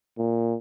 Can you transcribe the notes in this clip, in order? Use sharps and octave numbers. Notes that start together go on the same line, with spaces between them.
A#2